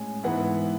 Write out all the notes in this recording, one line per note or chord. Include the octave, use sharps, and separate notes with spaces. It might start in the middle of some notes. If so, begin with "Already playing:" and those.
Already playing: A2 G#3 C#4 G#5
G#2 E3 B3 E4 F#5